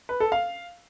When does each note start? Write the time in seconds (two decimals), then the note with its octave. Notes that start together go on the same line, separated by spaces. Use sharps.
0.09 B4
0.20 A4
0.32 F5